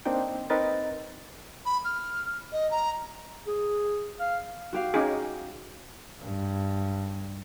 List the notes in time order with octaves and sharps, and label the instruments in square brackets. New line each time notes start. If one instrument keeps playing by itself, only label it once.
[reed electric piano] A#3 C4 D4 D#4 G5
C4 D#4 A#4 B4 D#5 A6
[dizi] B5
F6
D#5
A#5
[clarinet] G#4
F5
[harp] F#4 G4 F5
[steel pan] C#4 D#4 G#4
[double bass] G2